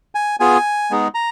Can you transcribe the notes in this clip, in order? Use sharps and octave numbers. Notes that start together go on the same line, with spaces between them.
G#5
B3 F4 G#4 G#5
G#3 B3 D#4 G#4
A#5